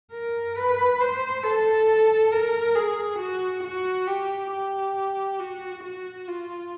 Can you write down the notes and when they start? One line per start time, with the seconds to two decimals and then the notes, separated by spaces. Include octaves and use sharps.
0.12 A#4
0.55 B4
1.00 C5
1.44 A4
2.31 A#4
2.75 G#4
3.19 F#4
3.64 F#4
4.07 G4
4.52 G4
5.39 F#4
5.84 F#4
6.27 F4